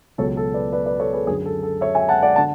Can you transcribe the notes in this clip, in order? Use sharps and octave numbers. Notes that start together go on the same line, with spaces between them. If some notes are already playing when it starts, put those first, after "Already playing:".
C#2 B2 F#3 A4 C#5
A4
B4 D5
B4 D5
B4 D5
A4 C#5
G#4 B4
F#2 D3 F#3 G#4
A4
A4
C#5 E5
E5 G#5
F#5 A5
D5 F#5
D3 F#5 A5